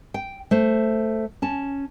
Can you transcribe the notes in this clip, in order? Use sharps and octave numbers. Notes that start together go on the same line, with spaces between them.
G5
A3 C5
C#4 A5